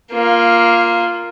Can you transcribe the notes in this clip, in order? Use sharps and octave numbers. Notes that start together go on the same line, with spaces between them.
A#3 F4